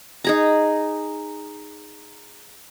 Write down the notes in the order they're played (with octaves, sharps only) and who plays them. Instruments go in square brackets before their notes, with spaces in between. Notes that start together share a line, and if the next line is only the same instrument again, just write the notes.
[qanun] D#4 G#4 A#5